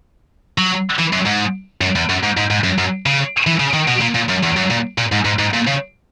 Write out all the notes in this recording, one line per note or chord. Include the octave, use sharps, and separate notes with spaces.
F#3
E3
F#2
G#2
F#2
E2
F#2
G#2
G#2
G#2
F#2
F#2
C#3
E3
C#3
D#3
B2
A#2
A#2
F#2
E2
F#2
A#2
A#2
G#2
G#2
G#2
A#2
C#3